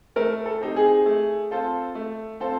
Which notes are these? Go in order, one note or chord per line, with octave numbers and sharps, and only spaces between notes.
A3 A#4
A4
C4 D#4 G4
G#4
A3
C4 F4 A4 C5
A3
C4 F4 A4 C5